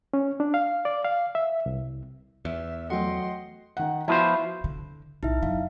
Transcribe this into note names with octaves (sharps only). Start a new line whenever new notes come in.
C#4
D4
F5
D5
F5
E5
C2
E2 E5
F#3 A3 D#5 F#5 G5 C6
D#3 F#5
F3 B3 E4 F#4 C5
D3
B1 A2 D#4 E4 E5
F#2 F#3 F5